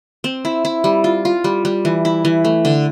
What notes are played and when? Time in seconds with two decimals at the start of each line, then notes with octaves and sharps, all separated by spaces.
0.24 C4
0.45 E4
0.65 E4
0.84 G3
1.04 F4
1.25 F4
1.44 G3
1.65 G3
1.85 E3
2.05 E4
2.25 E3
2.45 A3
2.65 D3